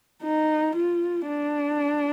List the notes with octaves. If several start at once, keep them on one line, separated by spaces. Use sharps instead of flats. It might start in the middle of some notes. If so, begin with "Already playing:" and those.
D#4
F4
D4